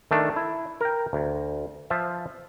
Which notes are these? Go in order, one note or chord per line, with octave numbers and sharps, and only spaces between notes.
D#3 A3 D4
E4
A#4 G5
D2
F3 F4 E5